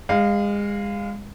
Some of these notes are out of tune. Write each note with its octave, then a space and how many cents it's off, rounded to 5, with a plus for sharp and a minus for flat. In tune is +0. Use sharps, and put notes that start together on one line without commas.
G#3 -30 F5 +0